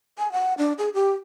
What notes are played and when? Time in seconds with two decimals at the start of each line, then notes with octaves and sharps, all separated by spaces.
0.18 G#5
0.32 F#5
0.58 D4
0.78 G#4
0.94 G4